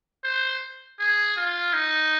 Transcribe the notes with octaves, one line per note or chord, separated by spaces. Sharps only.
C5
G#4
F4
D#4